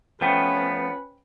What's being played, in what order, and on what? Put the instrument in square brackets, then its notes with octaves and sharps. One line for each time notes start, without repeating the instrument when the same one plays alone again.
[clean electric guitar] F3 A3 B3 [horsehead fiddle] C#4 B4 [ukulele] C5 G5